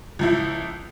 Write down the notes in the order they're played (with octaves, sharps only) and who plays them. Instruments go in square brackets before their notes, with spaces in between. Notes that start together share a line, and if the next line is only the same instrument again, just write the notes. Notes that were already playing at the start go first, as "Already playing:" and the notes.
[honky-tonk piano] C#2 F3 E4